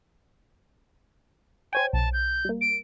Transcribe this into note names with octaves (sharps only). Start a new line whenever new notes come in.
C5 C#5 G5 G#5
B1 A5
G6
G3 A#3
D7